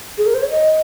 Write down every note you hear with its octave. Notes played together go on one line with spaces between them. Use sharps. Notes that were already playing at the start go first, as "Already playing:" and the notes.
G#4
A#4
C5
C#5
D#5